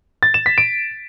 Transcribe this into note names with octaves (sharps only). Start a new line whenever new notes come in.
A6
E7
B6
D7